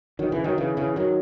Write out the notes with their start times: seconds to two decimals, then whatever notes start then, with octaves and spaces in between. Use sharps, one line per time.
0.19 D#3 F#3
0.32 C#3 E3
0.44 D#3 F#3
0.57 C#3 E3
0.77 C#3 E3
0.96 D#3 F#3